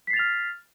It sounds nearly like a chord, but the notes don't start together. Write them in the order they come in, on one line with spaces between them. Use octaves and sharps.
B6 C7 A6 F7 F6